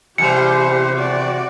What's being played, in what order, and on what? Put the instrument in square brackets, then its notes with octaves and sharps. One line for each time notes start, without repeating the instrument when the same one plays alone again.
[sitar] E2 G3 [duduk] C3 [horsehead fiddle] G4 C5 [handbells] C#7
[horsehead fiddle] F#4 D5